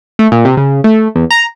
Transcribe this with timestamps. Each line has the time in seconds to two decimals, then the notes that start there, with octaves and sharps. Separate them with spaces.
0.19 A3
0.32 A#2
0.45 C3
0.57 C#3
0.84 A3
1.15 E2
1.31 A#5